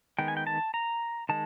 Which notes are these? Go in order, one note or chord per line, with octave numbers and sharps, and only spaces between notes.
D#3 G#3 B3 G5
G#5
G5
A5
A#5
D#3 G#3 A5